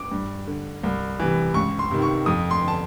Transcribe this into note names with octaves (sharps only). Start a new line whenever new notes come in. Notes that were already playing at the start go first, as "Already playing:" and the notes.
Already playing: D6
G2
D3
C2
C3 E3
C#2 C#6
C6
C3 D#3
C#6
F2 D#6
C6
D3
A5